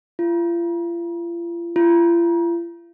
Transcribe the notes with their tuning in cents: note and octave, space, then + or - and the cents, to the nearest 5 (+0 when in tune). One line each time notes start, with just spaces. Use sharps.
F4 -40
F4 -45